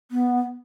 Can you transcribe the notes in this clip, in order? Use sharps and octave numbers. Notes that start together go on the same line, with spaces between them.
B3